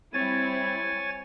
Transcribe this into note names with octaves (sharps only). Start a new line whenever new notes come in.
G3 C4 E4 C#5 G#5 A6